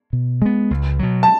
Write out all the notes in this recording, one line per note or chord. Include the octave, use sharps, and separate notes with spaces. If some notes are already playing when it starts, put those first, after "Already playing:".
B2
G#3 B3
C#2
B2 F#3
A5